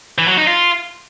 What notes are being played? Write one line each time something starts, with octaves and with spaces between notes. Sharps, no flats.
E3
F#3
D#4
F4